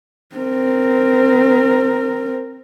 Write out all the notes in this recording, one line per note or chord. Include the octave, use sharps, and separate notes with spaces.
C4 A#4